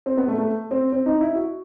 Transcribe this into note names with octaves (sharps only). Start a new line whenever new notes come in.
C4
B3
A3
A3
C4
C4
D#4
E4
F#4